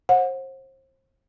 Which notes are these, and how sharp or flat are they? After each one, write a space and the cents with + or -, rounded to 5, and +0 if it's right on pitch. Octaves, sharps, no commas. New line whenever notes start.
C5 +35 F#5 -25